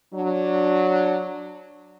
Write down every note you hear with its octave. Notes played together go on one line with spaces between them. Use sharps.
F#3 D4